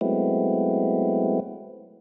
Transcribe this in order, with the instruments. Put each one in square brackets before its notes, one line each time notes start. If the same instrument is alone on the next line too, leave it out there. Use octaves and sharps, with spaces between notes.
[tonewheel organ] F#3 G#3 A3 B3 C4 E4